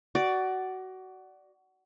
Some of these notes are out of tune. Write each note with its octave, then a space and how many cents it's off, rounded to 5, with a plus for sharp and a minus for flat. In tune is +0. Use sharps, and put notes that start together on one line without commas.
F#4 +20 D5 +0